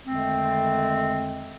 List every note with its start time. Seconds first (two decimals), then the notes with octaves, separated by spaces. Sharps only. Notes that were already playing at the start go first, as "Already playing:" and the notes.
0.06 F2 D3 D#3 G#3 A3 C4